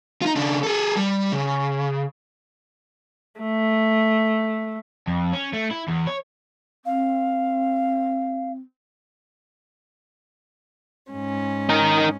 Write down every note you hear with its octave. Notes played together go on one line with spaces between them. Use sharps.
D#4 F4
C#3 D4
G#4 A4
G3
C#3
A3
F2
C#4
A3
E4
E2
C#5
C4 F5
G#2 C#4
D#4 A#4